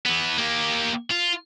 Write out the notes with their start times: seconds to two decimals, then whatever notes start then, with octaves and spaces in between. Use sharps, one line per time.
0.06 E3 B3
0.38 A#3 G4
1.11 F4